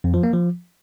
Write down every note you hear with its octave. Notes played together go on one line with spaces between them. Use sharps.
F2
F3
A#3
F3